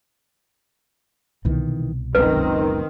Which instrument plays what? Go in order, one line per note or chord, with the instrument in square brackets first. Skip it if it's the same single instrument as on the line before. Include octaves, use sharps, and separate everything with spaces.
[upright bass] C2 B2 [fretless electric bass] D#3 E3
[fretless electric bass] F#1 C#2 F#2 [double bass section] D#3 C4 [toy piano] B4